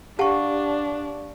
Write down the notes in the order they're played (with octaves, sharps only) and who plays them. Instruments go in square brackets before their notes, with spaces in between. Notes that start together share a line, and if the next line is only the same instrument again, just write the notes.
[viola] D4 [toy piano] G4 F#5 A5 [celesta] F5 C#6